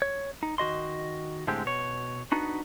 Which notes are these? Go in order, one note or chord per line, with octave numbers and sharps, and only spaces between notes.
C#5
D#4
D#3 F#4 D#5 C6
A2 D3 G#3 C4 G4
B2 C#5
B3 D4 D#4 F#4